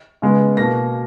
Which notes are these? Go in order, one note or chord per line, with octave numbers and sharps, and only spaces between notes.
C#3 G#3 B3
B2 A#3 A#6